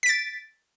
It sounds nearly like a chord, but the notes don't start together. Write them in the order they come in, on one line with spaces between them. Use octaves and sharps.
B6 D7 A6